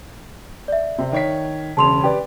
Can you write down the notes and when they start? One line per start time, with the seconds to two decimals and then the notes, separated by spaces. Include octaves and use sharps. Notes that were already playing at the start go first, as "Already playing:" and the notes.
0.68 D5 E5
0.98 C3
1.12 D#3 C#5 B6
1.77 E1 C#3 A5 C6 F7
2.03 G4 B4 D5